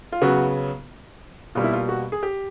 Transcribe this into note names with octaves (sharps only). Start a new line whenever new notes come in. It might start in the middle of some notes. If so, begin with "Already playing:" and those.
F4
C#3 F#3 B3 F#4
B2 G3 A#3 F4
E4
F4
F#4
G#4
G4